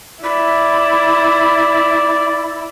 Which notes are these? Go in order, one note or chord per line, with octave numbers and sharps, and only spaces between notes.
E4 D5 B5